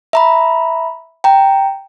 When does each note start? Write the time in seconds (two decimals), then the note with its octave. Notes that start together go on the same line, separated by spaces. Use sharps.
0.13 E5 A#5 B5
1.24 G5 A#5